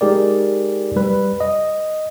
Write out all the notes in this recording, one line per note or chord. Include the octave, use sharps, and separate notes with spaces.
G#3 D#4 G4 G#4 A#4 D5
G3 B4
D#5